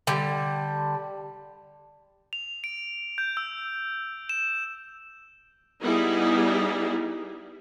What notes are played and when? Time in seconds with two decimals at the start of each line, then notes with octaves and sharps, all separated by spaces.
0.07 D3 G3
2.33 F7
2.64 D7
3.18 G6
3.37 E6
4.29 E7
5.83 G3 B3 D#4 E4 G#4